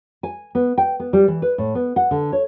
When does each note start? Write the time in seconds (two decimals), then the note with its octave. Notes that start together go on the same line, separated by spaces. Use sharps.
0.23 G#5
0.55 B3
0.78 G5
1.00 B3
1.13 G3
1.28 E3
1.42 B4
1.58 A2
1.75 B3
1.96 F#5
2.11 D3
2.32 C#5